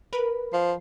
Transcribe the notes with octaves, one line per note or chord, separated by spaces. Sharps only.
A#4 B4 B5
F3 C7